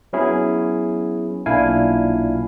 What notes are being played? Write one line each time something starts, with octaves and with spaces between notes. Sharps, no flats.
F#3 B3 C#4 E4 G#4
B1 A#2 D4 E4 F5 G#5